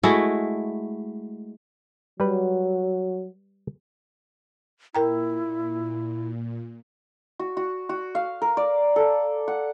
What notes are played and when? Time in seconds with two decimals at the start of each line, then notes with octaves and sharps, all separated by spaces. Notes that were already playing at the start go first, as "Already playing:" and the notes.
0.03 G#3 A3 E4 F#4
2.20 F#3 G3 B4
4.95 A#2 E4 A#4 G5 A#5
7.39 F#4
7.57 F#4
7.89 F#4
8.15 F5
8.42 A#4
8.57 D5
8.96 A4
9.48 F#5